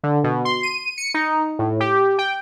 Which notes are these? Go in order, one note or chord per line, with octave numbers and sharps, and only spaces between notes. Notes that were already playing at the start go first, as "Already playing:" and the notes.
D3
B2
C6
D#7
C#7
D#4
A2
G4
G5